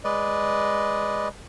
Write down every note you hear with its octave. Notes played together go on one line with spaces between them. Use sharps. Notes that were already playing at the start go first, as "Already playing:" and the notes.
G#3 B4 D5 D#5